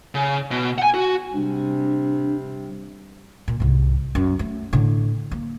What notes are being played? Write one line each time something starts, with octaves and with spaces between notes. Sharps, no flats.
C#3
B2
F#5 G#5
F#4
C3 G3 D4
A#2
C2 G#2
F#2
A3
A2 D3
A#3